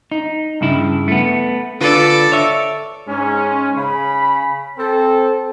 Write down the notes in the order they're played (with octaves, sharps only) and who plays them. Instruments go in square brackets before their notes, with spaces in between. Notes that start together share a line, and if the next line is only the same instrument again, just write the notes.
[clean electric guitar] D#4
G2 C#3 E4
A3 B3
[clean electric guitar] D3 F4 B4 [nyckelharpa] A4 D5
[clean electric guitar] C#5 E5
[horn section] G#2 G#3 C#4
C#3 B5
C4 A4